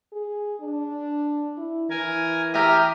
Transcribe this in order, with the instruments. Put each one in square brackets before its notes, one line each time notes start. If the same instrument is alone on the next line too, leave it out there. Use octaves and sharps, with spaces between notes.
[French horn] G#4
D4
E4
[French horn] E3 [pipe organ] A#4 G#5
[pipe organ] G4 D#6 F6 [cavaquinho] E5 A#5